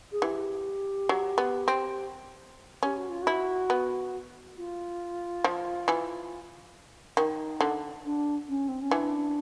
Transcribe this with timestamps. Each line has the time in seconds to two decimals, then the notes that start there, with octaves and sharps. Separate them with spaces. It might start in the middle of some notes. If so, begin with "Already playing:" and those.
0.12 G#4
0.22 E3 G4
1.09 F#3
1.38 B3
1.68 C4
2.83 C#4 G4
2.96 F#4
3.09 F4
3.22 F#4
3.27 E4
3.70 B3
4.57 F4
5.44 F3
5.88 E3
7.17 D#3 D#4
7.61 D3
8.05 D4
8.48 C#4
8.68 C4
8.80 C#4
8.91 E3 D4